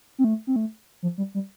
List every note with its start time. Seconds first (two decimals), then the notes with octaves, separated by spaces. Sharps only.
0.19 C4
0.24 A3
0.47 C4
0.56 A3
1.03 F3
1.18 G3
1.35 G3